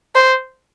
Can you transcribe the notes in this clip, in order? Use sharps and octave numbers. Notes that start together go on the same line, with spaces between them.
C5